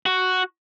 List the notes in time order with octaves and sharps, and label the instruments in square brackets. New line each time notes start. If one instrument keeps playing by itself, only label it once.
[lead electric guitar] F#4